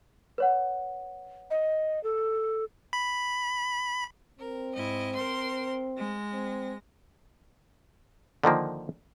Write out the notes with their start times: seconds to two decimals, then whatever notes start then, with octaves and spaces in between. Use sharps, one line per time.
0.38 B4 C#5 F#5
1.50 D#5
2.04 A4
2.93 B5
4.39 C4 A#4
4.75 G#2 E4 D#5
5.15 A#4 C5 C6
5.98 G#3 A#6
6.33 C4
8.44 D3 D#3 F3 A#3